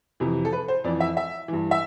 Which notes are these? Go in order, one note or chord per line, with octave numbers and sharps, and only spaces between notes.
F2 C3 E3
A4
B4
C5
F2 E3 D5
E5
E5
G2 E3
E5